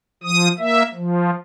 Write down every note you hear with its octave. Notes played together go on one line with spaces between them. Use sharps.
F3 D#6
A#3 E5
F3